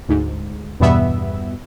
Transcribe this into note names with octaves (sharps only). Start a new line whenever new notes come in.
D2 G#2
E2 G2 B2 G3 B3 E5